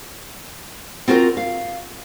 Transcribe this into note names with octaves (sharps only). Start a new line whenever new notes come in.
C4 F4 F#4 A4 A#4
F5